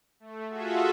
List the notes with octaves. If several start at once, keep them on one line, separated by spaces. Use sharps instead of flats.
A3
F4 F#4 G#4 A4 E5